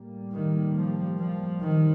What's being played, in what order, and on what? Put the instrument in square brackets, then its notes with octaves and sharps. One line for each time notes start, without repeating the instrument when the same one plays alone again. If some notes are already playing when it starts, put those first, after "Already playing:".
Already playing: [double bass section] A2 G3 A#3
[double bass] D#3
F3
F3
[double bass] D#3 [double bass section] G3 C4